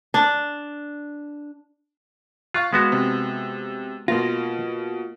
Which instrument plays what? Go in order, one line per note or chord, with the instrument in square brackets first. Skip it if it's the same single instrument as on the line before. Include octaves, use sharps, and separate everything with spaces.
[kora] D4
[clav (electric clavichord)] F4 [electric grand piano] F5 C#6 F#6
[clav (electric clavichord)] G#3 B3 F#4
[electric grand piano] C3
[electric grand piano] B2 A#6 [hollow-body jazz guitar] A#3 F4